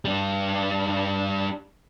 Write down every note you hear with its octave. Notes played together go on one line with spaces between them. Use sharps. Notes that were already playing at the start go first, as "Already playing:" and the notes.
G3 D4